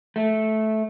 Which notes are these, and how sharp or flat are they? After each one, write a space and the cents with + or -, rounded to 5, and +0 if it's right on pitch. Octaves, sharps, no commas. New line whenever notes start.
A3 -10